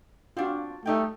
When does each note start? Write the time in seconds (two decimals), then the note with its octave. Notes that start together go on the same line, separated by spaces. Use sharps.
0.37 C4 D4 F4 F#4
0.86 G3 A3 D#4 G5